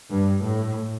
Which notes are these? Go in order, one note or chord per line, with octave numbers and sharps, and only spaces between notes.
G2
A2